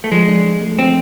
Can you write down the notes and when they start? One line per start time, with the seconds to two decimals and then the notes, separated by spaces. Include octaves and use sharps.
0.04 A3
0.12 F3 G#3
0.28 D4
0.45 F3
0.61 A3
0.78 F3 C4